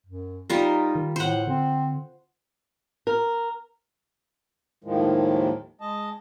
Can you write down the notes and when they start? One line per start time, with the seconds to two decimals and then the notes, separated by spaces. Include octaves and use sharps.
0.06 F#2
0.50 G3 D#4 F4 A#4
0.95 D#3
1.16 A2 C5 F#5
1.47 D3 C4
3.07 A#4
4.84 D#2 A2 D#3 F3 G#3
5.81 G#3 D#5 A5